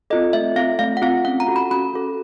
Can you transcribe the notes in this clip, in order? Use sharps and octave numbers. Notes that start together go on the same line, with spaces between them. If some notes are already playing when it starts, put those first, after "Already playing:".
C4 F4 A4 D#5
A3 E5
C4 F4 A4 F5
A3 F5
F#5
C4 F4 A4 F5
C#4 F#5
A#5
F#4 A4
B5
C#4 B5
F#4 A4